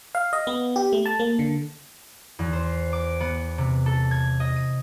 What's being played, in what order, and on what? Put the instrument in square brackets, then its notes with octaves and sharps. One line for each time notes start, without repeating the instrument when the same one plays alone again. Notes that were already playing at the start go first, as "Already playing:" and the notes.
[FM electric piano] F5
D#5
B3
G4
A3
A5
A#3
D3
[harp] E2
C5
D6
B3
C3
A4
G#6
D#5
D#7